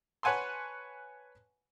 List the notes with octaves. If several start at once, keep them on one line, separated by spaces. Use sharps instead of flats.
B4 C#5 F#5 G#5 A5 C6